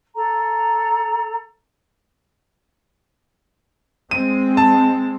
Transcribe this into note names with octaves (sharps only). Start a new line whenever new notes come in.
A4 A#5
G#3 C4 D#7
A5